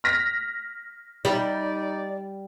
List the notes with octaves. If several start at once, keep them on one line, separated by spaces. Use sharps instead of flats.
F6 A#6 B6
G3 D#4 D5